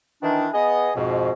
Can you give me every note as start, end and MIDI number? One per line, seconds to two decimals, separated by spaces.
0.22 0.48 51
0.22 0.48 52
0.22 0.48 62
0.53 0.90 59
0.53 0.90 68
0.53 0.90 75
0.95 1.32 41
0.95 1.32 44
0.95 1.32 47